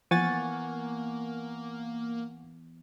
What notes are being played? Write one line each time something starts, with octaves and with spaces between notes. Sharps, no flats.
E3 F3 A#3 B3 F#5 G#5 C#6 A6